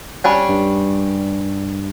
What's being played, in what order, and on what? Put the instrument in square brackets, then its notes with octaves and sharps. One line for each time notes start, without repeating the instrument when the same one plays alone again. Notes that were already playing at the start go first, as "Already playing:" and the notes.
[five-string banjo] G3 C#4 D4
[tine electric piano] G2